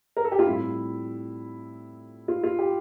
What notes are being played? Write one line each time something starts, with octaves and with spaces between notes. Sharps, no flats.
A#4
A4
G4
F4
A2 G3 C4 E4
F4
F4
G4